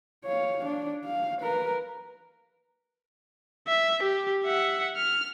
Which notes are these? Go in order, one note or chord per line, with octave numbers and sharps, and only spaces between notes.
C#5 F5
D4
F5
A#4 B4
E5
G4
E5 F#5
F6